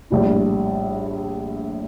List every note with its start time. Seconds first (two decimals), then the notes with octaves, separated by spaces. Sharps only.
0.10 A#1 A2 G3 D4